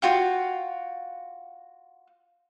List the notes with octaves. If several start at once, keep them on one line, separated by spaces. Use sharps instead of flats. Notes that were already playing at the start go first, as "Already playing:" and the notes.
F4 F#4 F5 G5